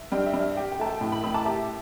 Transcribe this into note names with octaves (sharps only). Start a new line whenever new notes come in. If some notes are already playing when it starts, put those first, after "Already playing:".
Already playing: E5
G2 G5
E5
G2
E5
G4 G5
G5
A3 A5
G5
A2 G5
G5 B5
A2 B5 E6
A5 D6
G4 E5 A5